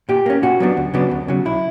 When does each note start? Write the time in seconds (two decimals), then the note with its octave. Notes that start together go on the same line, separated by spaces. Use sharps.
0.09 A#2 G4
0.26 A#3 C#4
0.43 A#2 F#4
0.60 F#3 B3 D4
0.77 D2
0.94 C#3 F#3 B3 D4
1.11 D2
1.28 C#3 F#3
1.45 B1 E4